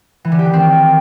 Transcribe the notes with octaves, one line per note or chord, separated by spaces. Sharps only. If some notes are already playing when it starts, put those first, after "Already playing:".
E3
D3
G4
D#3
C4